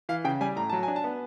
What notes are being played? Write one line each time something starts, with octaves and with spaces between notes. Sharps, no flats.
E3 F5
C#3 G5
G3 G#5
A2 A#5
F#3 A5
G#5
D4
A5
B3